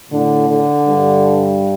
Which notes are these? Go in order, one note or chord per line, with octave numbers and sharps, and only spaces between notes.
A2 D3
D3
G2